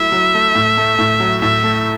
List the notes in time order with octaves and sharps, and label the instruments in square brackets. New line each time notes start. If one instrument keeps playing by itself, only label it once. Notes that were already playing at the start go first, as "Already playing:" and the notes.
Already playing: [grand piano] F#3 A3 E4 [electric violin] E5
[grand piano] F#3
A3
A2
A3
A2
F#3
[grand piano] A2 [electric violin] E5
[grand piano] A3